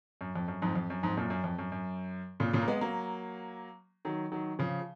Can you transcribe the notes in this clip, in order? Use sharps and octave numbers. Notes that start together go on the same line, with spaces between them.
F#2
F2
F#2
F2 G#2
F2
F#2
F2 G#2
F#2 A#2
F#2
F2
F#2
F#2
A#2 C#3
A#2 C#3
A#3
G#3 B3
F#3 A#3
D#3 F#3
D#3 F#3
C#3 F3